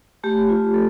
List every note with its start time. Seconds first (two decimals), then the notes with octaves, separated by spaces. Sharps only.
0.23 A3 G4
0.49 F4
0.74 A3 A4